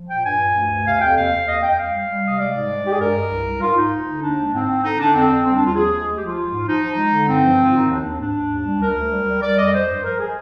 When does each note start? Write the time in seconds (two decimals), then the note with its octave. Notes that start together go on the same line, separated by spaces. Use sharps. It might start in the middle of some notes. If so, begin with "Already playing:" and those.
Already playing: F3
0.09 A#2 G5
0.25 G2 G#5
0.40 G2
0.56 D2
0.71 D2
0.86 C3 F5
1.01 F2 G5
1.16 D#2 F5
1.32 D#2
1.47 F2 D#5
1.62 F2 G5
1.77 G3 F5
1.94 G3
2.08 G3
2.23 C3 D#5
2.39 G#3 D5
2.54 G#2
2.70 G#3
2.85 G#3 G4
2.92 G#4
3.00 G2 A#4
3.15 G2
3.31 C2
3.46 C2
3.61 G#2 F4
3.76 G#2 D#4
3.92 D2
4.07 D3
4.22 D#2 D4
4.38 G#3
4.52 G#2 C4
4.69 G#2
4.83 D3 D#4
4.99 D3 D4
5.14 F2 C4
5.30 F2
5.45 G3 C4
5.54 D4
5.60 D#2
5.66 F4
5.75 F3 G#4
5.91 G#3
6.06 D2
6.16 G4
6.22 F3 F4
6.36 G#3
6.52 G#2
6.67 F3 D#4
6.83 F3
6.97 G#3
7.13 D3
7.28 G2 C4
7.44 F3
7.59 G#2 F4
7.74 D#3 D#4
7.89 D#2 D4
8.05 D#2
8.20 G#2 D4
8.35 G#2
8.51 D#2
8.66 G3
8.81 D2 A#4
8.96 D2
9.12 G3
9.27 G3
9.42 G3 D5
9.57 F2 D#5
9.73 F3 C5
9.89 G2
10.03 F3 A#4
10.19 G#3 G#4